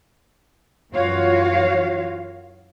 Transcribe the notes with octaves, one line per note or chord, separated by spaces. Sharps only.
F#2 E3 F4 F#4 C#5 F5